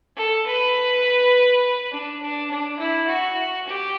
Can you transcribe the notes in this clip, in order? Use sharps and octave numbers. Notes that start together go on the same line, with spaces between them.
A4
B4
D4
D4
D4
E4
F#4
G4